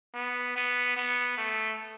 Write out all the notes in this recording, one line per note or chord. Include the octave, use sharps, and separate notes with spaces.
B3
B3
B3
A3